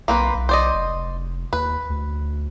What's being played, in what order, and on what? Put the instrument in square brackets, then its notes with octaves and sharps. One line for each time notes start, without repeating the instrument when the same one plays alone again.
[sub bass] B1 [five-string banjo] A#3 C4 B4
[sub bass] B1
[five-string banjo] C5 D5 D#5
[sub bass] F1
[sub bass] D#2 [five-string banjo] B4
[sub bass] D2